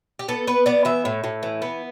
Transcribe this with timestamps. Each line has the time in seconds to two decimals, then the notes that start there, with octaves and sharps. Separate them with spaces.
0.19 G4
0.28 B3 A4
0.47 B3 B4
0.66 B3 D5
0.85 E3 E5
1.05 A2
1.24 A2
1.43 E3
1.62 B3